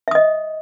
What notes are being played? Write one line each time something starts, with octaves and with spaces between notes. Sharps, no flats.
D#5 E5 D#6